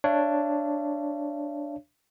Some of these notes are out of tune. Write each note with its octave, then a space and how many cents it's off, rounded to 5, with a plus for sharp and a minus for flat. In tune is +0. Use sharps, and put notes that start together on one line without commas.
D4 +0 C#5 +0 F5 -45